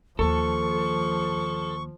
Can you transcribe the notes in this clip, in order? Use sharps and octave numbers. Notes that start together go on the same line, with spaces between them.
D#2 F3 A#3 A4 C#6